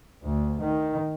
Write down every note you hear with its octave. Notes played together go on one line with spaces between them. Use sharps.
D2
D#3